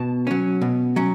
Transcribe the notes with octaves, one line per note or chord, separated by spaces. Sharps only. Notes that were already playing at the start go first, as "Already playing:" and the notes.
Already playing: B2 A5
F#3 C#4
B2
F#3 C#4